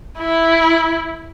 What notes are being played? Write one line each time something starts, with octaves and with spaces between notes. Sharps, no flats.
E4